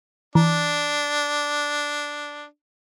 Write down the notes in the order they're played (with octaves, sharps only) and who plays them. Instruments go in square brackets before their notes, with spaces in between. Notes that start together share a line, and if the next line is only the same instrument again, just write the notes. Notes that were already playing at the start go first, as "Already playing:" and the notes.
[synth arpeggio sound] E3 [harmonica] D4